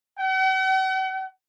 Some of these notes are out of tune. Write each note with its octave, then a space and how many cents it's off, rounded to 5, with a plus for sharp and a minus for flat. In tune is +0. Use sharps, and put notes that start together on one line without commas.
F#5 +45